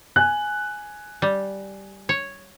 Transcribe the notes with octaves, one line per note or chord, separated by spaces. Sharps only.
G#5 F#6
G3
C#5